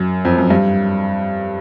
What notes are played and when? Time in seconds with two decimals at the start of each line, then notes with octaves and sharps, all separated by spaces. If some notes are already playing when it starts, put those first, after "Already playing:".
Already playing: F#2
0.25 F2
0.38 F#2
0.50 G2